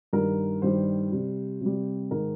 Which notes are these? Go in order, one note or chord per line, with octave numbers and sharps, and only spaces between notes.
G2 D#3 G3 A#4
G2 D#3 G3 C5
C3 G3
C3 G3
G#2 D#3 G#3 A#4